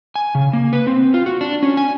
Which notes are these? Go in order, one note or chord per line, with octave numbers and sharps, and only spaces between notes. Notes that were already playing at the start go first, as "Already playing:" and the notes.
G#5
C#3
A#3
B4
C4
F4
F#4
D4
C#4
G#5